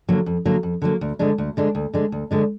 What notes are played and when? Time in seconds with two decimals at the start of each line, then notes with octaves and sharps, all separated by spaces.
0.09 D3 F#3 A#3
0.26 F2
0.45 D3 F#3 A#3
0.63 F2
0.82 D3 F#3 A#3
1.01 D2
1.19 D3 G#3 D4
1.38 D2
1.57 D3 G#3 D4
1.75 D2
1.94 D3 G#3 D4
2.12 D2
2.31 D3 G#3 D4